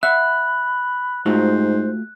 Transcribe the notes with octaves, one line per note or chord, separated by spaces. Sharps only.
E5 F#5 B5 F#6
G#2 A3 F4 F#4 C5